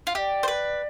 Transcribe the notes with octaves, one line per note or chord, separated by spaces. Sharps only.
F4
G4 D5 E5
C5
B4